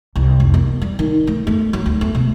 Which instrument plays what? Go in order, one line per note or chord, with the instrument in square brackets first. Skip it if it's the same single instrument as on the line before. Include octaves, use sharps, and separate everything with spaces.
[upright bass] C2
F1
A#3
G3
D#3
A3
A3
F#3
D2
A3
B2